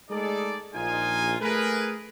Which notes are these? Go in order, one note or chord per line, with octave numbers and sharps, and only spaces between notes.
G#3 A3 D#4 G#4 A4 D5
A#1 D#4 F4 G#5
A3 G#4 A#4 B4